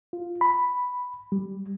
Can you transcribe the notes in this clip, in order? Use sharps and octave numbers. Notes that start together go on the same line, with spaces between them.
F4
B5
G3